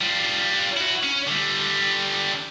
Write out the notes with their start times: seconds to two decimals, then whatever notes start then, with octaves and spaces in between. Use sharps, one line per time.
0.01 G3 F4
0.77 E4 F#4
1.04 C#4
1.27 D3 G3